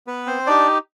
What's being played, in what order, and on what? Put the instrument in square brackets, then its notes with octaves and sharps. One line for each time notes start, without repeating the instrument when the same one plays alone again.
[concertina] B3 B4
C4 C5
D4 D#4 G4 D5